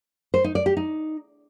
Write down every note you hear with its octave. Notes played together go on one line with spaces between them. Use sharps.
C5
D#4
D5
G4
D#4